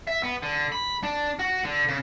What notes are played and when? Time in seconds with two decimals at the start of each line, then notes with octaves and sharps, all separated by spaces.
0.07 E5
0.23 B3
0.43 D3
0.72 B5
1.03 D4
1.39 F#4
1.65 D3
1.88 C#3